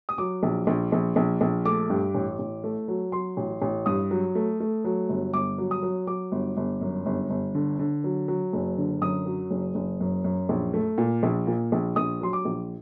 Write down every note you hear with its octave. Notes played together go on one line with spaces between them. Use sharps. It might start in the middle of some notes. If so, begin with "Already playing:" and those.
D#6
F#3 D6
A#1
A#1
A#1
A#1
A#1
A3 D6
G2
A1
A1
A3
F#3
F#3 C6
A1
A1
G2 D#6
F#3
A3
A3
F#3
G1
G1 D6
F#3
D#6
F#3
F#3 D6
G1
G1
F#2
G1
G1
D3
D3
F#3
F#3
F#1
D3
F#2 D#6
F#3
F#1
F#1
F#2
F#2
A#1
A3
A#2
A#1
A#2
A#1
A#1 D#6
F#3 C6
D6
A#1